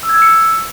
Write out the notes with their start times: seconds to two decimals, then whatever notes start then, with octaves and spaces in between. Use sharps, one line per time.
0.03 E6
0.09 G#6
0.16 E6
0.22 C#7